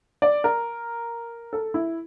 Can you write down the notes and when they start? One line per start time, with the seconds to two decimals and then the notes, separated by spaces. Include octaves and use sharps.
0.22 D5
0.44 A#4
1.53 A4
1.74 E4